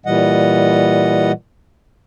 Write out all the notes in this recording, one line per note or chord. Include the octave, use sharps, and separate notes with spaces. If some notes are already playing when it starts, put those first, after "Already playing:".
A#2 E3 G3 D#5 F#5